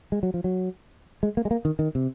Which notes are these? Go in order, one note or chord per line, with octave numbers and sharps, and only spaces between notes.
G#3
F#3
F3
F#3
G#3
A#3
G#3
A#3
D#3
D#3
C3